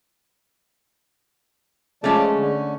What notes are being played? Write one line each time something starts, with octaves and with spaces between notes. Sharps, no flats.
F3 G#3 A3 C#4 D5 A5
D3